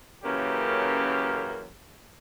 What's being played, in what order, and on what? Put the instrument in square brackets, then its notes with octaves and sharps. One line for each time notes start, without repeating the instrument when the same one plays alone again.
[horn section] F#2 C#3 E3 A#3 C#4 G4